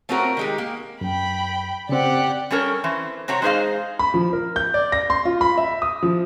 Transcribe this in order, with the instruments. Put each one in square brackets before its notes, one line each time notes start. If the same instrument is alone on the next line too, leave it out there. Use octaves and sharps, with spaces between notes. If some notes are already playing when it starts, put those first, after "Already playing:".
[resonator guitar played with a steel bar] A3 C4 C#4 F4 F#4 A#4
D#3 G#3 G4
A#3
[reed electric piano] F#2 [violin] G5 B5
[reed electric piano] C#3 C4 [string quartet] G4 [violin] D5 F#5
[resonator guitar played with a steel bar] G3 C#4 A4 A#4 C#5
E3 C4 C#4
C3 C4 F#4 C#5 A#5
G#3 D#4 G#4 C5 D#5 F5
[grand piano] B5
F3
A#4
G6
D5
A#6
C6
F4
B5
E5
D#6
F3